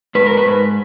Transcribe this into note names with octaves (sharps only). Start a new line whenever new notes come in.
G#2 B4
A#4
B4
G#2